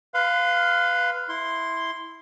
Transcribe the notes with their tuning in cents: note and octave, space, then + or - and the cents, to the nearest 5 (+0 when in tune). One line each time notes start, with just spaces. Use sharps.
B4 +0 F5 +0 C6 -40
E4 -10 C6 +0